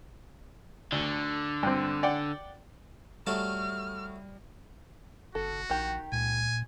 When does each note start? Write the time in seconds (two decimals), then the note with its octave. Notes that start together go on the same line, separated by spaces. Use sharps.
0.92 D2 D3
1.63 G2 C4
2.03 D5 F#5 G5
3.27 F#3 G3 A3 A5 F6
5.35 F#1 F#4 A4
5.70 A#1 D#3 G4
6.12 C#2 A#2 G#5